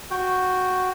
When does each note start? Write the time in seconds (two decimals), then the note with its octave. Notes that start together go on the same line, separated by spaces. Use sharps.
0.11 F#4 G5